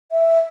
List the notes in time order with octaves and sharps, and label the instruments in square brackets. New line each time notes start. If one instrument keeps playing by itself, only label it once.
[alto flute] E5